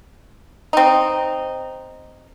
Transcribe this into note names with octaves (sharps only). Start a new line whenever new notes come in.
C4 D#4